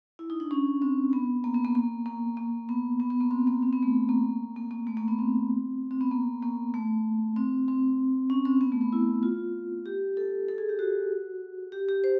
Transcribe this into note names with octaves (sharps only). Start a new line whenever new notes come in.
E4
D#4
D4
C#4
C4
B3
A#3
B3
A#3
A#3
A#3
A#3
B3
B3
B3
A#3
C4
A#3
C4
B3
A3
A#3
A#3
A#3
A3
A#3
B3
C4
C4
B3
A#3
A#3
A3
C4
C4
C#4
C4
B3
A3
B3
E4
F4
G4
A4
A4
G#4
G4
F#4
G4
G4
C5